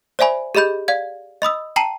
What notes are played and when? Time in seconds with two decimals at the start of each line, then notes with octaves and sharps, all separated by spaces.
0.19 C5 D5 E5 G#5 B5
0.55 G4 G#4 D#5 B5 G6
0.88 D5 F5 G#6
1.42 D#5 B5 D#6 E6
1.76 G5 A5 A#5 C7 D#7 F#7